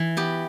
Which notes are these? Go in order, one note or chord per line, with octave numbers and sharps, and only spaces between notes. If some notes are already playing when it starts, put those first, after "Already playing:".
Already playing: E3
B3 G4